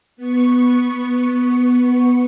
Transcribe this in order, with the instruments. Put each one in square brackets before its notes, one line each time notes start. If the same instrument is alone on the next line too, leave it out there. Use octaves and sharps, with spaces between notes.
[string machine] B3 C#6